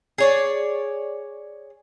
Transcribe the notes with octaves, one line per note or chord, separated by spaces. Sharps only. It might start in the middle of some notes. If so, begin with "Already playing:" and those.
G#4 C#5 D5